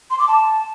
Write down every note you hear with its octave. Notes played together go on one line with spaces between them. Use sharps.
C6
D6
A5